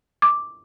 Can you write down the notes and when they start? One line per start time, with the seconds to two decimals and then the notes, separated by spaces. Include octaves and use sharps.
0.22 D6